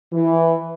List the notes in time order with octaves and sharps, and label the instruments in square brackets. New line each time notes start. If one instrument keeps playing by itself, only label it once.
[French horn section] E3